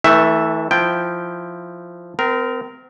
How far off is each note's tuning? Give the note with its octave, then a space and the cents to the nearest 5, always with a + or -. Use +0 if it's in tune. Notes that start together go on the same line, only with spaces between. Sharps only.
E3 -30 A3 +0 E5 +0
F3 +0 E4 +0 G5 +0
C4 -35 A#4 +0